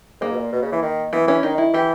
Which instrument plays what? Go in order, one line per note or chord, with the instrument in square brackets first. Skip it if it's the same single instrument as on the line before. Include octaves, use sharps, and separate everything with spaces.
[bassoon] G#2 [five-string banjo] A#3
[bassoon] B2
A#2
B2
C#3
E3
D#3
[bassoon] E3 [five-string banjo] B3
[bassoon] E3 [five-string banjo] C#4
[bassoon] D#3 [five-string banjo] D#4
[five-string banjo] E4
[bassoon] E3 [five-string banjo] G4